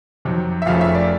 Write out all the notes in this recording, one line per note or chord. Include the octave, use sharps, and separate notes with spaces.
F2 C3 D#3 F#3
E5
F1 F2 C#3 F3 A3 F5
E5
D5